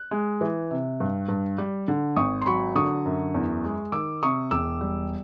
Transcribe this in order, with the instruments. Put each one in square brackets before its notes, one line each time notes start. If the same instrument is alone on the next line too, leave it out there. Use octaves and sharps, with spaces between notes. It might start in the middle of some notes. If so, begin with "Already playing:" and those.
Already playing: [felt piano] F#6
G#3
E3
C3
G2
G2
G3
D3
G#1 C#6 D#6
C6
F#3 B5 C#6
D3 C#6 D#6
F#2
E2
G#3
D#3 D6 E6
C3 C#6 D#6
E1 D6 E6
G3